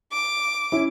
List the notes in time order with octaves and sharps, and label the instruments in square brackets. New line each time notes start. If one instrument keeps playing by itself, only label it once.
[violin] D6
[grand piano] C#4 E4